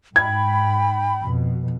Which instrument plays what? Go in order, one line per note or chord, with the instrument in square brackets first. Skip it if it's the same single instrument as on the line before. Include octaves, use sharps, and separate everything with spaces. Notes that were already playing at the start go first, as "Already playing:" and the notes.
[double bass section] G#2 [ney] G5 [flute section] B5 [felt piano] G#6
[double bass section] F2 B2